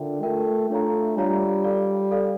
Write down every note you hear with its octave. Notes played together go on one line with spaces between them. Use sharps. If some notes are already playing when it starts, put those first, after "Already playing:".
Already playing: D3 F4 A#4 E5 G5
A3 F4 A#4 E5 G5
A3 D4 F4 C#5 F5 A#5
G3 D4 F4 C#5 F5 A#5
A4 D5 F5
A4 D5 F5